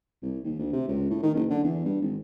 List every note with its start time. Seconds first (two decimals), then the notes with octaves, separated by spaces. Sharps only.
0.22 C2
0.44 D#2
0.59 D2
0.73 C3
0.88 C#2
1.10 A2
1.23 D#3
1.35 F#1
1.50 D3
1.64 E2
1.85 G2
2.02 G#1